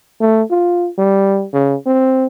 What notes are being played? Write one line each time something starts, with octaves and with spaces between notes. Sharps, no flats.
A3
F4
G3
C#3
C4